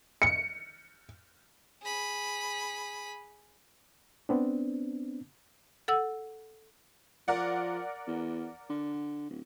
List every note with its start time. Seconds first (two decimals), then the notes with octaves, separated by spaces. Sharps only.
0.22 C#7
1.83 G#4 B5
4.29 B3 C4 D4
5.88 A4 F#5 E6
7.28 F3 A#4 D5 F#5
8.07 E2
8.69 D3
9.30 D1